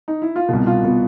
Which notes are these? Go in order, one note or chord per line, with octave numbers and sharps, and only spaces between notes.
D#4
E4
F4
C2 B2 F#4
F4
B2 B3